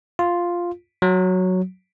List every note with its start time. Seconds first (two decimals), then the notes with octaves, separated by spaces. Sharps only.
0.19 F4
1.02 F#3